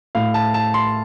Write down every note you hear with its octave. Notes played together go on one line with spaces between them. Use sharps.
A2 F5
A5
A5
C6